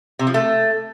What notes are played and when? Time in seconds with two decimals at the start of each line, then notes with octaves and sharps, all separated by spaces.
0.19 C3
0.27 F3
0.34 A3